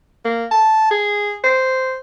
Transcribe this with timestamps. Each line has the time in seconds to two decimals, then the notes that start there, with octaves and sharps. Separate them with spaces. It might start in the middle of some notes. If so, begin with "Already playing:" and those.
0.25 A#3
0.52 A5
0.91 G#4
1.44 C5